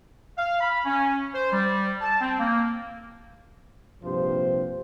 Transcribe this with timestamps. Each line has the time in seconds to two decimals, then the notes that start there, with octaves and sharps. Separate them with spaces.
0.38 F5
0.61 B5
0.85 C#4
1.35 C5
1.52 G3
2.01 A5
2.21 C4
2.40 A#3
4.03 A#1 G2 C3 F3 C5